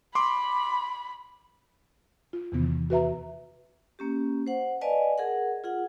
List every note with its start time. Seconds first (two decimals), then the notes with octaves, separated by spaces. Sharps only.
0.15 B5 C6 D6
2.33 F4
2.52 E2 C3 D#3 E3 B3
2.90 F#4 B4 E5 A#5
3.99 A#3 C#4 G4
4.47 C5 F#5
4.81 B4 D5 D#5 F5 G#5 A5
5.18 G#4 A#4 F#5
5.64 F4 G#4 F#5